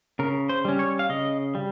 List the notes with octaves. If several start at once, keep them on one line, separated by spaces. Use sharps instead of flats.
C#3 A#4
C5
G3 C#4
C#5
F5
C#3 D#5
G3